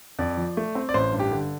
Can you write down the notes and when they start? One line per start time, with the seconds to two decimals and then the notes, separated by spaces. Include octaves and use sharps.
0.19 F2 D5
0.37 F3
0.57 A3
0.75 C4
0.89 D5
0.94 A1 C5
1.12 G2
1.19 G4
1.32 D3